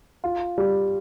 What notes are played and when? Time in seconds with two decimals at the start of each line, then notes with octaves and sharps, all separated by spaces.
0.24 F4
0.58 G3